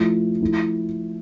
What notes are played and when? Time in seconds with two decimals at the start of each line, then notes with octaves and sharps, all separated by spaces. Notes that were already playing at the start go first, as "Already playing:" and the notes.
Already playing: F3 A3 E4
0.41 F3 A3 E4